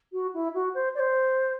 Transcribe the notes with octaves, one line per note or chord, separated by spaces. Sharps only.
F#4
E4
F#4
C5
D5
C5